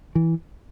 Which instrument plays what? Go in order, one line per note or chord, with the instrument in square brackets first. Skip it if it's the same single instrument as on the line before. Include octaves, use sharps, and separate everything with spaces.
[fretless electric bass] E3